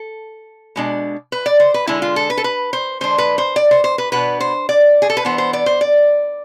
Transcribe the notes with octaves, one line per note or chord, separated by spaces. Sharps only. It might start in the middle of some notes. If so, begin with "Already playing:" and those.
Already playing: A4
B2 G#3 D4
B4
D5
C5
B4
D3 G#3 D4 E4
F4
A4
B4
A4
B4
C5
D3 G#3 D4 C5
B4
C5
D5
C5
C5
B4
B2 B3 D4 B4
C5
D5
G#4
A4
B4
E3 B3 D4 C5
C5
D5
C5
D5